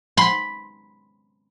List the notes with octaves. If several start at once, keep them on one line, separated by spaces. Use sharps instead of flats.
B5 C6